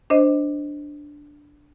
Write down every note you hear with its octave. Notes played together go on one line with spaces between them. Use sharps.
D4 C5 D#5